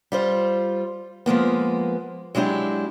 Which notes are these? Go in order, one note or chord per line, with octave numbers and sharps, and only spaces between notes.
G3 F4 C5
F3 G#3 A#3 B3
F#3 G#3 D4 E4 G4